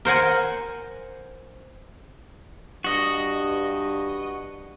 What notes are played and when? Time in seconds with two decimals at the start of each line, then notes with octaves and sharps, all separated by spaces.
0.05 A#4 C5 F#5 G#5
2.84 G2 F#4 D#5